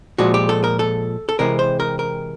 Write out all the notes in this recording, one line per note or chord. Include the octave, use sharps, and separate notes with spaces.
A#2 F3 G#3 F#4
G4
A4
A#4
A4
A4
C3 E3 G#3 C4 A#4
C5
A#4
A#4